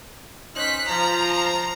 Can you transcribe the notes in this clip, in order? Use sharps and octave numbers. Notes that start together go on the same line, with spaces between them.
C#4 D#4 C5 F#6 B6
F3 A#5